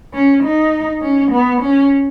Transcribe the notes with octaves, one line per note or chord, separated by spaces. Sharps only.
C#4
D#4
C#4
B3
C#4